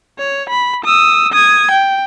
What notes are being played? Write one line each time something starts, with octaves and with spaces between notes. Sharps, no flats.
C#5
B5
D#6 E6
D#6 G#6
G5